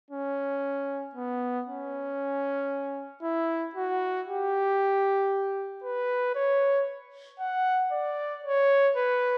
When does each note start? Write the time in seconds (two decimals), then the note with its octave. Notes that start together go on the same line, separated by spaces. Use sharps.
0.11 C#4
1.15 B3
1.67 C#4
3.23 E4
3.75 F#4
4.27 G4
5.84 B4
6.36 C#5
7.40 F#5
7.92 D5
8.44 C#5
8.96 B4